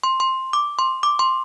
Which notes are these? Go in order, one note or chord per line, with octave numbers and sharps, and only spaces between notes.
C6
C6
D6
C6
D6
C6